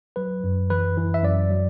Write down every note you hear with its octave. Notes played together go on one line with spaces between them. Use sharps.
F#3 B4
F#2
E3 B4
E3
E5
F#2 D5
F#3